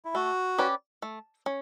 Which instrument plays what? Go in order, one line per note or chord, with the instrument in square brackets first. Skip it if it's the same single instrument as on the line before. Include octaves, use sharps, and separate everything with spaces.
[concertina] E4
[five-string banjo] A3 [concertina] F#4
[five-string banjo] C#4 G4 B4 D5
A3
C#4